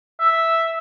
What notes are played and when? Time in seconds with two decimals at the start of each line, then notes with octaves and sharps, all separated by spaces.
0.20 E5